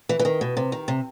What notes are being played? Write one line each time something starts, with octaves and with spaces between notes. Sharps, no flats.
E3
E3
D#3
B2
C3
D#3
C3